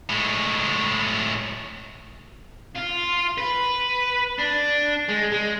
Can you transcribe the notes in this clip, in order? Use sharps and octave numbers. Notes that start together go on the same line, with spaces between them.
A2 G#3
F4
B4
D4
G#3
G#3